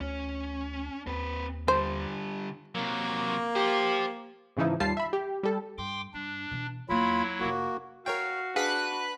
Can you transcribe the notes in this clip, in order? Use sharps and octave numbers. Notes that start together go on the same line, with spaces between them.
D2 C#4
D#2 C4 B4
D3 G3 C5
C3 F#3 A#3
G4 C5 F5
G#2 C#3 E3 F3 D#4 E4
D#2 G3 F4 A5 C7
E5 B5
G4
G3 A4
G2 G5 C6 D6
G2 D4
B2 E3
E2 F#3 A#3 E4 F4 B5
F1 A#3 F4 F#4
F#4 A#4 C#5 F5 G5
D4 G#4 B4 F5 F#5 F#6